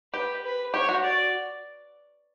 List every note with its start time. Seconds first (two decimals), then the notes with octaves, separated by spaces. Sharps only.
0.13 G4 B4
0.44 B4
0.74 G4 C#5
0.89 F#4
1.03 D5